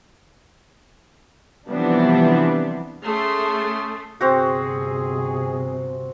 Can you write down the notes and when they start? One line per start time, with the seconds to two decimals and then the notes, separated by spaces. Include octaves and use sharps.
1.68 C3 E3 F3 G3 B3 D4
3.06 A3 C#4 G#4 A5 C6 D#6
4.21 G1 C3 C4 F#4 G#4